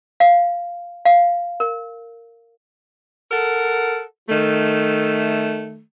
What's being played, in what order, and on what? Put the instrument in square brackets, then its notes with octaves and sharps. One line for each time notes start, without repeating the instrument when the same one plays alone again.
[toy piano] F5
F5
A#4
[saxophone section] A4 A#4 F#5
D#3 A3